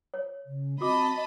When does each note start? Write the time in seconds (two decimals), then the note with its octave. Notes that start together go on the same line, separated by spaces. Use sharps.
0.14 C#5
0.46 C#3
0.81 C4 F#4 D#5 A5 B5 D6